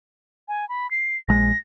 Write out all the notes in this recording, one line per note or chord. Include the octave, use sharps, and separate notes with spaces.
G#5
B5
C7
A#1 G#3 A#6